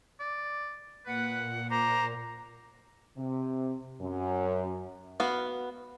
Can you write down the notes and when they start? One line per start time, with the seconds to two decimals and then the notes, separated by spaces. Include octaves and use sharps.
0.20 D5
1.06 A#2 B4 F#5
1.71 C5 A#5 D6
3.17 C3
4.01 F#2
5.20 B3 F#4 F5